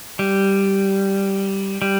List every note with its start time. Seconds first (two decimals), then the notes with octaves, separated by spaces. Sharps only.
0.19 G3
1.82 G3